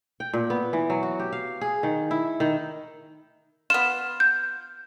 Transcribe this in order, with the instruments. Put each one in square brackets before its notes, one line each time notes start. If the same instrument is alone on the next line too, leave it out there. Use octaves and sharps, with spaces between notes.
[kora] G5
A#2
B3
E3
F#3
F#4
G4
F5
G#4
D#3
E4
D#3
[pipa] B3 F4 [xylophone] E7
[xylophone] G6